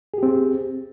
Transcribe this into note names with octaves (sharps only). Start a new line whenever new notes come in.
C4 G4 G#4